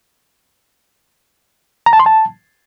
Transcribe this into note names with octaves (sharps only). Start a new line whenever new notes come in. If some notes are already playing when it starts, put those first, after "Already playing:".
A#5
A5
C6
A5